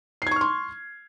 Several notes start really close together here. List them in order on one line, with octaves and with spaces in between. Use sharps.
C7 G#6 C#6 F6 C6